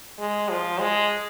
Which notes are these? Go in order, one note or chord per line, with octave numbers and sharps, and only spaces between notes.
G#3
F3
G#3